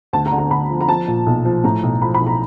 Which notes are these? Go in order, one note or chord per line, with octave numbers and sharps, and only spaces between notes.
D2 A5
A#5
D3
A#5
D2 B5
F3
A#5
F3 A5
A#2
B1
F3
A2 A#5
B1
F3 B5
B5
B1
A#5